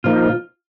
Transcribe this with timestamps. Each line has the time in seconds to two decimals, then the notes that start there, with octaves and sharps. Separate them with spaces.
0.04 A#2 F3 A#3 D#4 F4